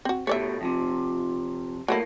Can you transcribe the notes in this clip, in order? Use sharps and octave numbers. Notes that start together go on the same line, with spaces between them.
C4 F#4
B2 A3 G4 C#5 D5 E5
F2 A2 C3 F4
A2 F#3 A3 A#3 E4